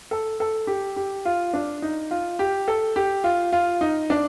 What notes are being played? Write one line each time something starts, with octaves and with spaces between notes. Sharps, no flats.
A4
A4
G4
G4
F4
D4
D#4
F4
G4
A4
G4
F4
F4
D#4
D4